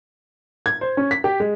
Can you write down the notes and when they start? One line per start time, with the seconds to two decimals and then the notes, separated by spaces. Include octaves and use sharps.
0.66 G#6
0.81 C5
0.97 C#4
1.11 B6
1.24 G4
1.40 G#3